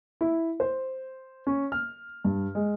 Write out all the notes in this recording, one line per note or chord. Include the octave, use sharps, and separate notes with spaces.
E4
C5
C#4
F6
G2
G#3